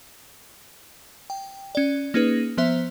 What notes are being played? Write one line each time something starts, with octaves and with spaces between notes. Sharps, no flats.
G5
C#4 D5
A#3 C#4 D#4 G#4 B4
F3 B3 C5 E5